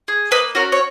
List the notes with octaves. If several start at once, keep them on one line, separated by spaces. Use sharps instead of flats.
G#4
A#3 B4 D#5
C#4 F#4 A#4 C#5
C#5